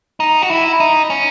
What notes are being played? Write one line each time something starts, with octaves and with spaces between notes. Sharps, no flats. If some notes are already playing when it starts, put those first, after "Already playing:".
D#4
F#4
E4
D#4
C#4